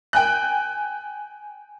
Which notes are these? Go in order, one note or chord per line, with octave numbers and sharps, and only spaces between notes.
G5 G#5 F#6